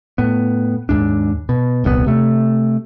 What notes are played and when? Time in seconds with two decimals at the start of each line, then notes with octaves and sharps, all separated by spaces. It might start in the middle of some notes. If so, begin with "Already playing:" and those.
0.18 A2 B3
0.89 D#2 G#2 D4
1.49 B2
1.84 D#1 C2 C3 B3
2.06 C3 A3